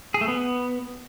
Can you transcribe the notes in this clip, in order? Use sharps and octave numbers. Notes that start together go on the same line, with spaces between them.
G#4
A3
B3